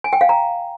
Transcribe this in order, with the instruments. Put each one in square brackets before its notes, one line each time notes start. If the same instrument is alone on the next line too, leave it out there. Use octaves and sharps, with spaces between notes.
[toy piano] G#5
G5
F5
A#5